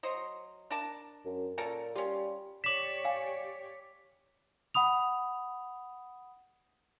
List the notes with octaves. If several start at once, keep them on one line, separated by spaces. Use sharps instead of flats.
F#3 C5 D#5
D4 A#4 A5
F#2
A#2 C#4 A4 A#4
G3 C#4 F4
G4 C#5 D5 D6 B6 E7 F#7
F5 G5 G#5
F#5 B5 D#6 F7